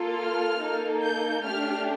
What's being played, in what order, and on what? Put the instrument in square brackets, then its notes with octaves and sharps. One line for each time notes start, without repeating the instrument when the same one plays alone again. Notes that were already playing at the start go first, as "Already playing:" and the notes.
Already playing: [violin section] A#3 F4 A4
F6
A#3 D#4 A4
G6
A3 D4 G4 F6